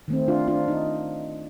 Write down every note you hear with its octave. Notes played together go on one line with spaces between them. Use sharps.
D#3 A3 C4
D4 F4
D4 F4
D#4